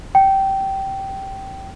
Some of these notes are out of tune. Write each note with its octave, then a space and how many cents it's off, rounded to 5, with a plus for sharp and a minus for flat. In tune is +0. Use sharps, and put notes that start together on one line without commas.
G5 -15